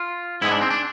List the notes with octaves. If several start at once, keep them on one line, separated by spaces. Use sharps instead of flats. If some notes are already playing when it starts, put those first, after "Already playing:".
Already playing: F4
G#2 G#3 B3 E4
D4
C4
D4